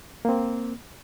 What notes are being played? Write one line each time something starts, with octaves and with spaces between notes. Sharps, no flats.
A#3 C4